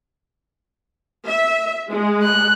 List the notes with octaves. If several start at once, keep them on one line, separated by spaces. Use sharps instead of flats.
E5
G#3
F#6